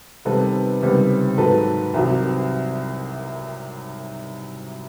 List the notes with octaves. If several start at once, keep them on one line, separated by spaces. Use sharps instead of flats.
C3 D#3 G3 B3 D#4 A4 B4
C#2 C3 D#3 G3 B3
G#2 D#3 F#3 A4 B4
C2 C3 D#3 F#3